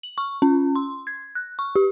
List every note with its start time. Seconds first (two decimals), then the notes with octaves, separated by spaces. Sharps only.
0.03 F#7
0.18 C#6
0.42 C#4
0.76 C6
1.07 G#6
1.35 F#6
1.59 C#6
1.76 G4